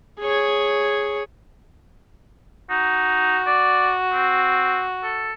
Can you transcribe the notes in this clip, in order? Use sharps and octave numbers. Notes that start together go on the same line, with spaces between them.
G#4 C#5
D#4 F#4
D5
C4
A4